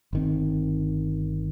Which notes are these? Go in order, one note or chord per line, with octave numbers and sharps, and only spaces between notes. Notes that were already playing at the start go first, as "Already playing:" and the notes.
G1 D#3 C4